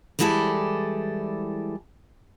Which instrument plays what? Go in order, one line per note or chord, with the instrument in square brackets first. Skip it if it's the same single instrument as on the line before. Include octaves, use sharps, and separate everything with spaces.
[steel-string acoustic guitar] E3 G3 G#3 E4 A4 D5